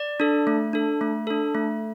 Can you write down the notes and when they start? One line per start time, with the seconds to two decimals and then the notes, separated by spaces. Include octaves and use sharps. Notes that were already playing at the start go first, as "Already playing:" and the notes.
Already playing: D5
0.20 D4 A4
0.47 A3
0.73 D4 A4
1.01 A3
1.27 D4 A4
1.55 A3